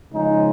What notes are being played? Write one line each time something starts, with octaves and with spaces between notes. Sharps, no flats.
C#3 F3 G#3 D#4